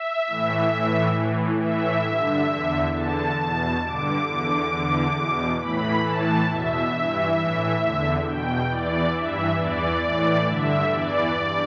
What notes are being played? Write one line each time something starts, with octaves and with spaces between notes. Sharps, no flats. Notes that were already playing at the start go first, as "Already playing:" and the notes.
Already playing: E5
A2 E3
A2 E3
A2 E3
A2 E3 E5
G2 D3
E2 D3
E2 D3 A5
E2 B2 A5
G2 D3 D6
E2 D3 D6
E2 D3
E2 B2
A2 E3 B5
A2 E3 A5
E2 B2 E5
G2 E3
A2 E3
E2 D3
E2 B2 G5
E2 E3 D5
G2 E3 E5
E2 E3 D5
A2 E3 D5
G2 D3 E5
E2 E3 D5
G2